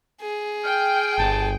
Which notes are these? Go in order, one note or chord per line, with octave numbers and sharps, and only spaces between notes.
G#4
G5 F6
G1 A5